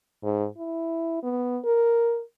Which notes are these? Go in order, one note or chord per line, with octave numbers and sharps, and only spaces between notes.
G#2
E4
B3
A#4